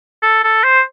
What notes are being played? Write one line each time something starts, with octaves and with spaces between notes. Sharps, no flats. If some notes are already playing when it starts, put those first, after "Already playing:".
A4
A4
C5